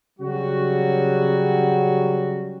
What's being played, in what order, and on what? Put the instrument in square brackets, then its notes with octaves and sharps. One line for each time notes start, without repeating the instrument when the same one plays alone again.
[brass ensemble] C#3 F#3 G3 F#4